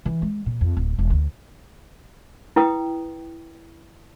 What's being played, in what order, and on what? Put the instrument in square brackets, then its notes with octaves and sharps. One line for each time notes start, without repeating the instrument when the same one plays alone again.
[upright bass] E3
G#3
A#2
F2
D1
E1
D2
[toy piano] E4 B4 G5 D#6